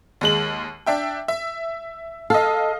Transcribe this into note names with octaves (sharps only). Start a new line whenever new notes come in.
D#2 G#3 F#7
D4 E5 G5
E5
A4 D#5 F5